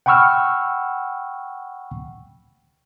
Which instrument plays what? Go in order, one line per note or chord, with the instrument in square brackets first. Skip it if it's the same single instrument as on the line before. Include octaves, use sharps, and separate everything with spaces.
[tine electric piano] F#5 G5 B5 C#6 E6 F6